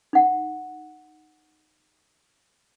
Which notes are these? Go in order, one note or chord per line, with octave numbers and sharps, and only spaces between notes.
D#4 F#5